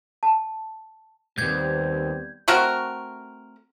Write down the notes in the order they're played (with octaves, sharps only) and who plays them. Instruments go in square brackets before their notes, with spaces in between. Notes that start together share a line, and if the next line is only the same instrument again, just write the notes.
[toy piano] A5
[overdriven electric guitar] D#2 G#2 [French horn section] G3 B3 C4 [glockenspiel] G6 G#6
[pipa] A3 C4 F#4 A#4